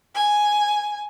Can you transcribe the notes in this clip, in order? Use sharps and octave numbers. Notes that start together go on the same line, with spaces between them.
G#5